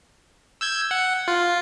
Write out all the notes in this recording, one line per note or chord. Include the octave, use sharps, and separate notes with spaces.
E6 G6 G#6
F#5
F4